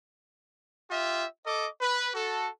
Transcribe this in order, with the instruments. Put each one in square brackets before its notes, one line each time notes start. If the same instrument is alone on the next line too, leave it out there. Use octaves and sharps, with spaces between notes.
[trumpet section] F4 G4 E5
A4 D#5 D6
B4
F#4 A4